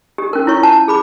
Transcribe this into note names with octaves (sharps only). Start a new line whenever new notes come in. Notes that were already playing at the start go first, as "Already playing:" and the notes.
G4
C#4 A#4
E4 F4 C#5 C#6
A5
G#4 B5 D6